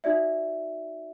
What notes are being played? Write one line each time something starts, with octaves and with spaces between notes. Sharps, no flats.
D#4 F#4 D5 E5